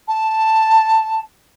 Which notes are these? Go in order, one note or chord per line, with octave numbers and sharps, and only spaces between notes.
A5